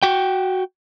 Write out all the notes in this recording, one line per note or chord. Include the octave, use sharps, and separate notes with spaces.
F#4 G5